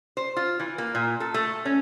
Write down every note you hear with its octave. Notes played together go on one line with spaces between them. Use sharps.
C5
F4
E3
A#3
A#2
A4
A3
C#4